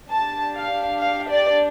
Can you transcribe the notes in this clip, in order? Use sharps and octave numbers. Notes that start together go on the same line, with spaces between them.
D4 G4 A5
F5
F5
D5